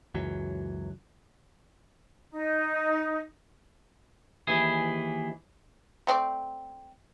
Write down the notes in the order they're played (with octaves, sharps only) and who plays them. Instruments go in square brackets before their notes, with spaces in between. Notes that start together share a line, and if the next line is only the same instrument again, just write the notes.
[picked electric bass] C#2 F#2 E3 F#3
[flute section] D#4
[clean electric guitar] D#2 E3 G#4
[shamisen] A3 C4 D5